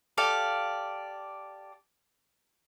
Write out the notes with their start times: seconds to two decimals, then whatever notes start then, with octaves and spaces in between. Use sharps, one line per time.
0.17 G4 A4 D5 F5